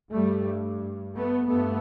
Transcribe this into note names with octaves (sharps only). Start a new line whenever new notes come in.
G2 G3 A3
A3 B3
G2 A3 B3